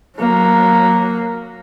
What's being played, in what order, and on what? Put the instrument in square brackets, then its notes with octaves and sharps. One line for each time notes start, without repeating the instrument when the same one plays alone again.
[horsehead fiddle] F#3 A#3